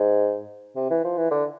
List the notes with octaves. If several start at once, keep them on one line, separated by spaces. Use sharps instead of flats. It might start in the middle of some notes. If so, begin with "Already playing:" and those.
Already playing: G#2
C3
E3
F3
E3
D3